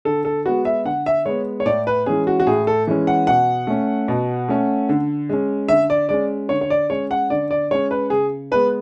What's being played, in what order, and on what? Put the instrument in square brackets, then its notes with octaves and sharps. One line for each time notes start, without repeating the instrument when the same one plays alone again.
[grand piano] D3 A4
A4
G#3 B3 F#4
E5
D3 F#5
E5
G#3 B3 C#5
C#5
A2 D5
B4
E3 G#3 C#4 G#4
F#4
F#4
A2 G#4
A4
E3 G#3 C#4
F#5
B2 F#5
A3 C#4
B2
A3 C#4
D3
G#3 C#4
D3 E5
D5
G#3 C#4 D5
D3 C#5
C#5
D5
G#3 C#4 C#5
F#5
D3 D5
D5
G#3 C#4 C#5
B4
C#3 G#4
G#3 B3 B4